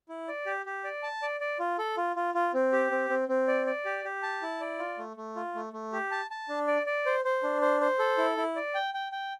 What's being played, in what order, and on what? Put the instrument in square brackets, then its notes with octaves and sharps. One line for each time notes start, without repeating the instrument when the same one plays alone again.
[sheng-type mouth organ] E4
D5
G4
G4
D5
A5
D5
D5
F4
A4
F4
F4
F4
C4
G4
C4
C4
C4
D5
D5
G4
G4
A5
E4
D5
F4
A3
A3
F4
A3
A3
G4
A5
A5
D4
D5
D5
C5
C5
D4
C5
C5
A4
E4
E4
D5
G5
G5
G5